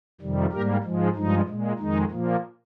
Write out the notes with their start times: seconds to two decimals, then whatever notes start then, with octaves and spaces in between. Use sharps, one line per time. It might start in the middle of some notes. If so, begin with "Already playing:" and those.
0.21 F2 C3 D#3 G3
0.52 G#2 G3 A#3 G4 A#4
0.83 G#2 F3 G#3
1.16 G2 F3 G#3 D#4
1.48 A#2 G#3
1.79 F2 D#3 G#3 D#4
2.11 A#2 F3 A#3